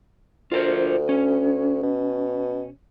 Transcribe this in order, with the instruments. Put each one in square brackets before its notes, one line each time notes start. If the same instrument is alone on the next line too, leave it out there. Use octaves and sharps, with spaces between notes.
[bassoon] D2 [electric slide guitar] F4 A#4 C5
[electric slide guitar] C#4
[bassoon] B2